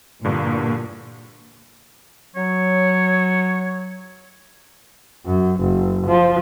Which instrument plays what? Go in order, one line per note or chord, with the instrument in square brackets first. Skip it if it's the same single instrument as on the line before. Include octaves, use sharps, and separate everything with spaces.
[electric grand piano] E2 G2 D3 [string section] A#2
[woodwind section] F#3 [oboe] C#5
[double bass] F#2
F#1
F3